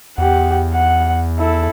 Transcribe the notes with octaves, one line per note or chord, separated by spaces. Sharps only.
E2 G4 F#5
F#5
E4 A4